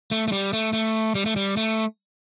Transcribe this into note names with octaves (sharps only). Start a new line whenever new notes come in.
A3
A3
G3
A3
A3
G3
A3
G3
A3